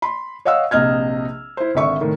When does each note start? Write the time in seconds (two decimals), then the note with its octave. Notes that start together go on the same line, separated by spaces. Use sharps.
0.02 B5 C6
0.45 C#5 D#5 F5 F#5 E6
0.71 A#1 C3 D#5 F6 G#6
1.57 E4 C5
1.75 G#1 D3 E5 C#6
2.00 A2 D#3